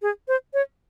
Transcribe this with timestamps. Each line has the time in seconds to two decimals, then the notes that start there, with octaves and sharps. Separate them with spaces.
0.02 G#4
0.28 C5
0.54 C#5